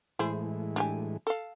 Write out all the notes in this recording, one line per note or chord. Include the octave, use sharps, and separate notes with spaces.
A2 E3 G#3 E4 G#4 C5
D4 G4 G#5
A4 F5